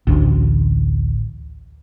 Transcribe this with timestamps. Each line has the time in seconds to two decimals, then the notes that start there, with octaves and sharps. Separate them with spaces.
0.07 A1 D2